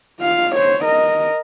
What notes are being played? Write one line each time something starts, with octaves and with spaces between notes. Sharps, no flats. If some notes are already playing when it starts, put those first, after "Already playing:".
F4 F5
C5 C#5
A#4 D#5